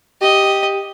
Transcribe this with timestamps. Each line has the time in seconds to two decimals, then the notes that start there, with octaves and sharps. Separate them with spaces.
0.22 G4 D#5